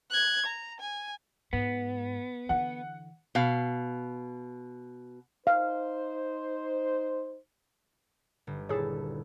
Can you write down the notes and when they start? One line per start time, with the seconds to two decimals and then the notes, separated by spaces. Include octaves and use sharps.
0.10 F#6 G#6
0.46 A#5
0.79 G#5
1.53 G#2 B3
2.49 D3 E3 F#5
3.35 B2 F5
5.47 D#4 C5 F5
8.47 G1
8.69 D#1 E4 G#4 A4 C#5